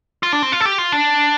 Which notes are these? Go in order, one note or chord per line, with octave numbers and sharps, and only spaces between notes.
F4
D4
C4
F4
A4
G4
F4
D4